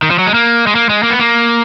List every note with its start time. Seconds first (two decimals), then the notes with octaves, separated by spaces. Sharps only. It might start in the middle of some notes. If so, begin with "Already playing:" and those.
0.03 D#3
0.10 F3
0.19 F#3
0.27 G#3
0.34 A#3
0.67 G#3
0.75 A#3
0.89 G#3
1.03 A#3
1.10 B3
1.19 A#3